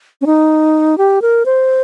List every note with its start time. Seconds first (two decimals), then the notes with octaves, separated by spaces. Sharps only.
0.21 C#4
0.26 D#4
0.98 G4
1.22 A#4
1.46 C5